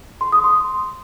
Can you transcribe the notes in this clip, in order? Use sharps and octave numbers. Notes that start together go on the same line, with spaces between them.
C6
D#6
C6